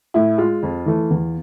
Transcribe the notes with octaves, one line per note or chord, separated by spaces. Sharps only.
A2 E4
G#3 F4
F2
E3 A3
E2